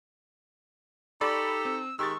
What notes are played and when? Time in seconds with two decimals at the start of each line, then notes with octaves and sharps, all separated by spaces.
1.21 D#4 G4 A4 D5 B5 C#6 E6
1.65 C4
1.99 D#3 G#3 G4 C#6 E6 A6